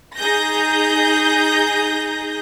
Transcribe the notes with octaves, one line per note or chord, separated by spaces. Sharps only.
D#4 G#4 G6 A#6